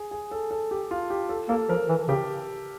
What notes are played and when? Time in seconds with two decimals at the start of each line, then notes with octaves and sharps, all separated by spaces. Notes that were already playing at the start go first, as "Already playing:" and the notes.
Already playing: G#4
0.11 G#4
0.31 A4
0.51 A4
0.71 G4
0.91 F4
1.10 G4
1.29 A4
1.49 A#3 A4
1.69 F3 A#4
1.89 E3
2.08 C#3 G4